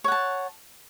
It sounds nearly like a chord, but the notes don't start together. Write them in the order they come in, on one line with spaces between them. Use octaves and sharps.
C#5 F#5 A5